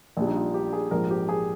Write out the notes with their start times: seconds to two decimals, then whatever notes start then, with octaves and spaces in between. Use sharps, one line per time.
0.17 A#1 A#2 G3 D4
0.27 D#4
0.36 F4
0.54 G4
0.73 G#4
0.91 A#1 G#2 F3 A#4
1.11 G4
1.29 G#4